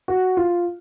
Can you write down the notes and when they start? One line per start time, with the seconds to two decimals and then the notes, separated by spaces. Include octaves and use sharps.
0.08 F#4
0.37 F4